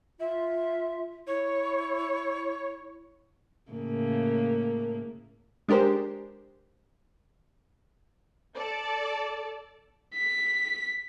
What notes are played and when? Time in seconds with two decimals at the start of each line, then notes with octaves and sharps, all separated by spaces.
0.20 F4 E5
1.27 E4 C#5
3.71 A2 C#3 A#3
5.68 G#3 D4 G4 A#4 C5
8.56 A4 D5
10.14 B6